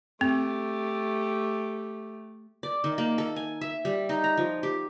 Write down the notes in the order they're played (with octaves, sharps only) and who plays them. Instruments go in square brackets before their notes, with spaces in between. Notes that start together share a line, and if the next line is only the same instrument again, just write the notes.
[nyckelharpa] A3 G4 [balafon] C4
[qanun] D5
D#3
A#3
A4
G#5
E5
G3
D#4
A#5
F3
G4